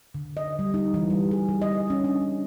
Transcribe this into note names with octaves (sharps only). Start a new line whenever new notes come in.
D3
D#5
G3
D#4
E3
G3
G#4
G3
D#5
C#4
D4